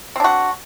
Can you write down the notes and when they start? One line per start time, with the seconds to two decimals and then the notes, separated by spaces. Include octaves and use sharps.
0.16 C4
0.20 D4
0.24 F#4